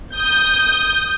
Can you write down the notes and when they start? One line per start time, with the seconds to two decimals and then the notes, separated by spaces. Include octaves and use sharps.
0.13 D#6 G6